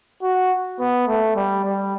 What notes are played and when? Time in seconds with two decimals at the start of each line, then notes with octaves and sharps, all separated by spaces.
0.22 F#4
0.79 B3
1.07 A3
1.35 G3
1.64 G3